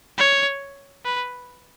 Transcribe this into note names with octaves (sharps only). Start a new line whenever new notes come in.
C#5
B4